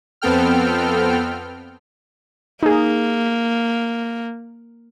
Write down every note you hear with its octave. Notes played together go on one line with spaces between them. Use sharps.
F2 B3 C4 A4 G5 F6
A#3 D#4 G#4